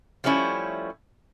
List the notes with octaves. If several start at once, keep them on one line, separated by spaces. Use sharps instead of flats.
F3 G3 A3 C#4 E4